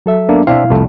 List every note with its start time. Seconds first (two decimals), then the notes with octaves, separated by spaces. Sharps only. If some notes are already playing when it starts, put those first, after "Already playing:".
0.06 F#3 A4 E5
0.29 A#3 B3 D4
0.47 B2 C4 D4 E4 E5 F5
0.70 C2 F2 A3